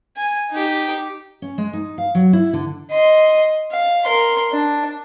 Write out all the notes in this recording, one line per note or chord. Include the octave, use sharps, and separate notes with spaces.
G#5
D#4 G4
C#4
G#3
D#4
F5
F#3
E4
D3
D#5 C6
F5
A#4 C6
D4